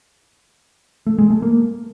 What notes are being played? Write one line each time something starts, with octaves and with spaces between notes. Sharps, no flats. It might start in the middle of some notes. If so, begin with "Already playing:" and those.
A3
G#3
A3
A#3